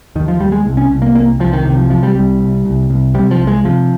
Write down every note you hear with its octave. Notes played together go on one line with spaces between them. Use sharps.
D#2 D#3
F3
D#2 G3
G#3
C2
C#4
C2
A#3
C2 A#3
C2 F3
D#3
C3 D#3
F3
C3 F3
G3
C2 G3
C2
C2
C2
C3 G3
F3
C2
G#3
C3 F3